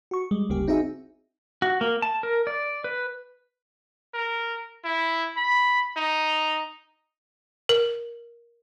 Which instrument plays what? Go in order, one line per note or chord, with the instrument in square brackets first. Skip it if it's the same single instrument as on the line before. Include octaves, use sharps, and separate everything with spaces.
[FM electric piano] F#4 C#6
G3 G#3
G1 D2 C#3 G3 A#3 G4
C4 D#4 F#4 G#4 E5
[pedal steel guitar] F#4
A#3
A5
A#4
D5
B4
[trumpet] A#4
E4
B5
D#4
[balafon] A#4